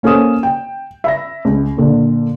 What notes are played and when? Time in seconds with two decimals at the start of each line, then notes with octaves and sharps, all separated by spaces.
0.03 A#3 C#4 A4 C5 D#6 E7
0.43 G5
1.04 E5 B5 A#6
1.45 C#2
1.77 A#2 D3